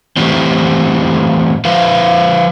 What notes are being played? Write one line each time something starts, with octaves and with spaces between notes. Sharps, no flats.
A2 E3 G3 C4
F3 B4 C5 F5